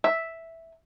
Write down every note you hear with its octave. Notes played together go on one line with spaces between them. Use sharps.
E5